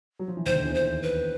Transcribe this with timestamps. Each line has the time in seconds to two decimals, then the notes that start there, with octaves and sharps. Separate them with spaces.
0.19 F#3
0.28 F3
0.37 E3
0.46 D#2 D#3 C5
0.56 D2 D3
0.65 E2 E3
0.75 C5
1.03 B4